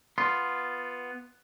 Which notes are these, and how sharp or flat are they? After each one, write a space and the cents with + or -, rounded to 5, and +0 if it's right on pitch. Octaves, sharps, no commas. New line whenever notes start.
B3 +0 F4 +0 C6 +0